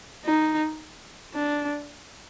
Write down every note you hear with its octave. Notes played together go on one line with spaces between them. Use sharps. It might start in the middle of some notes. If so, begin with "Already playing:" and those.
D#4
D4